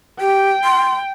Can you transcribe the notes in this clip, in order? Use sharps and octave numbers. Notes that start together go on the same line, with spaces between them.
G4 G5
C6